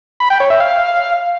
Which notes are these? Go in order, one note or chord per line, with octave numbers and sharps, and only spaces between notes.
B5
G5
C#5
E5
F5